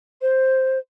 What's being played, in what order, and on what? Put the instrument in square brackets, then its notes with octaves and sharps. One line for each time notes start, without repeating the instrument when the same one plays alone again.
[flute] C5